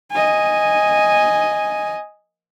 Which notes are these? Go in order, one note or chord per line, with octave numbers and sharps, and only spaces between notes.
D#5 G#5